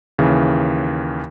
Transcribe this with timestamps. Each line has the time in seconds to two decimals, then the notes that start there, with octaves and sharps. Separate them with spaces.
0.18 D#2 C#3 E3